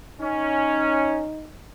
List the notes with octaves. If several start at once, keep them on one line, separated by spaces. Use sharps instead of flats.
C#4 D#4